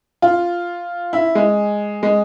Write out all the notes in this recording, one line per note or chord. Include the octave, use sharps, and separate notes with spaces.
F4
E4
G#3
G#3